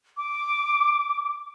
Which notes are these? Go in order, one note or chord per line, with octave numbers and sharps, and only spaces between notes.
D6